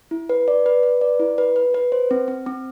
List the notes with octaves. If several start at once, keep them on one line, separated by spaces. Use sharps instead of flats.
E4
B4
D5
B4
B4
D5
E4
B4
B4
B4
C5
C4
C4
C4